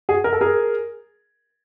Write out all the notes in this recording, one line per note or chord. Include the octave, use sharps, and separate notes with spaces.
F#4 G#4
A#4
A4
G#4 A#4